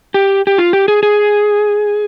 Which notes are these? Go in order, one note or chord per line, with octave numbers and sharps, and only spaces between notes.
G4
G4
F4
G4
G#4
G#4